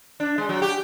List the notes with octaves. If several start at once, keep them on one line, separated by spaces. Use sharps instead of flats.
D4
G#3
F#3
G4